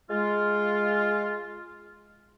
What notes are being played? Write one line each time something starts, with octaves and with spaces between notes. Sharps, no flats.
G#3 F4